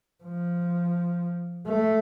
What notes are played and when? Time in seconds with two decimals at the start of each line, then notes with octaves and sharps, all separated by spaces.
0.24 F3
1.67 A3